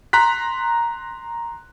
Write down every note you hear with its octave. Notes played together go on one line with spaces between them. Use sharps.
A#5 C6 F#6 B6